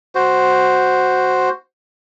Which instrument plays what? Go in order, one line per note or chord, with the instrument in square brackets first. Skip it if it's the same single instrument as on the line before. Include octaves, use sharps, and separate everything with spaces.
[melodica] F#4 C5